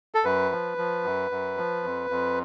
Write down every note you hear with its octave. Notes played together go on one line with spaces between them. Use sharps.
A4
F#2 B4
F3
F3
F#2
F#2
F3
F2
F2